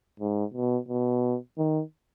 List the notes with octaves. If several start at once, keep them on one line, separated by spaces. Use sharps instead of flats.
G#2
B2
B2
D#3